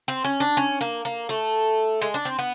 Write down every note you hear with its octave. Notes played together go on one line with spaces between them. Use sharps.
C4
C#4
D4
C#4
A#3
A#3
A3
G#3
D4
C4
B3